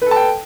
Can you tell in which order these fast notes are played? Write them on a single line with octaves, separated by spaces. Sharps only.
B4 A4 A5 G5